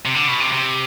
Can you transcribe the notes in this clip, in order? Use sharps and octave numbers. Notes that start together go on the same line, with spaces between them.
C3
D3
B2
C3
C3